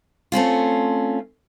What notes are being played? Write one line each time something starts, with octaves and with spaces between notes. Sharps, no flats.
A3 C4 C#4 F4